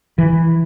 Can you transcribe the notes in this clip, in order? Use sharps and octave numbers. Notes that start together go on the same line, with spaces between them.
E3